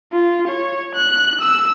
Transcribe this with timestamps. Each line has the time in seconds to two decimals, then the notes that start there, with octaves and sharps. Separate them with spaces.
0.12 F4
0.47 C#5
0.95 F#6
1.41 E6